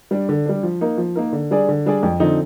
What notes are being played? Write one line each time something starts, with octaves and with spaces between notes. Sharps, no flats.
G3 D4
D3
G3 D4
F3
A#3 D#4 A#4
F3
A#3 D#4 A#4
D3
G3 D4 G#4 D5
D3
G3 D4 G#4 D5
F2
D3 F3 C4 D#4